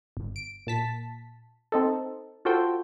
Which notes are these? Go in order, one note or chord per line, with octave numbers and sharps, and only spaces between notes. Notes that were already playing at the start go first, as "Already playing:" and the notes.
G1
D7
A#2 A5 B6
C4 D#4 A4
F4 F#4 A4 C5 G5